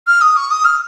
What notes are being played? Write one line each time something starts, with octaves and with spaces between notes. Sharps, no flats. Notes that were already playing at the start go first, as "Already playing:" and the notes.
F6
D#6
C#6
D#6
F6